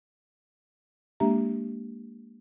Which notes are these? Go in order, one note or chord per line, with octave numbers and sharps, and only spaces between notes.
G#3 A#3 D4 G4 E5 A#5